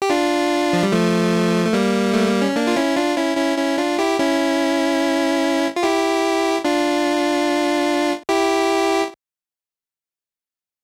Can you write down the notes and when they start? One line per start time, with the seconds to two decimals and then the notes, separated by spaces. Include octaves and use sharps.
0.02 G4
0.10 D4 F4
0.73 F3
0.83 G3
0.92 F3 A3
1.66 A3
1.73 G3 A#3
2.14 A3
2.28 A#3
2.42 C#4
2.56 A#3 D4
2.67 F4
2.76 C#4 E4
2.96 D4 F4
3.16 C#4 E4
3.37 C#4 E4
3.58 C#4 E4
3.78 D4 F4
3.99 E4 G4
4.19 C#4 E4
5.76 F4
5.83 E4 G4
6.65 D4 F4
8.29 E4 G4